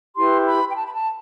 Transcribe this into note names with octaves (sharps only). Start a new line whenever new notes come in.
E4 G4 B4 C6
B5
G5
A5
B5
A5